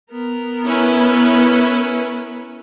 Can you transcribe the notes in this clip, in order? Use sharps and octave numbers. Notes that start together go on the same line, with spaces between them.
B3 A#4
C#4 E4 B4